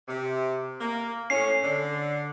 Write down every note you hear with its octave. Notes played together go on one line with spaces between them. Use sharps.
C3
A#3
A2 C#4 C7
D3